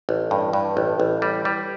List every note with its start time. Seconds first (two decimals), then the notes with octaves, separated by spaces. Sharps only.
0.09 A1
0.31 G2
0.53 G2
0.77 A1
1.00 A1
1.22 G3
1.45 G3